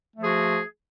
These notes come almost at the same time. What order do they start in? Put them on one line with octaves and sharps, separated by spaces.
A3 F3 G#4 F#4